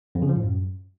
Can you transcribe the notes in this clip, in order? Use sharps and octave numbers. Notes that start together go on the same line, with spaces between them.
F2
C#3
F3
A2
F#2